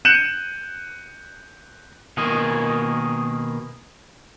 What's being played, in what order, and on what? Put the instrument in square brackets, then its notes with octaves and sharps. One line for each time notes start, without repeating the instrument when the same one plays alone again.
[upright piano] F#6 G6 C#7 D#7 E7 F#7
[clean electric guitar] B2 D#3 A#3 D#4 G#4